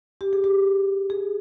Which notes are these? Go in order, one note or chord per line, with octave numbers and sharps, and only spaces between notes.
G4
G#4
G4
G#4